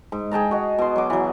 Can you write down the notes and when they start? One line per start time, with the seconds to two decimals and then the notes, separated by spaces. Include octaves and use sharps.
0.12 G#2
0.31 G#4 G5 A5 A#5
0.51 F#4 D#5
0.78 B2 C6
0.96 F#3 D6
1.10 E3 F#3